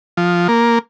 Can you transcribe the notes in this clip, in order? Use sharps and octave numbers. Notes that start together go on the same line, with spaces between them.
F3
A#3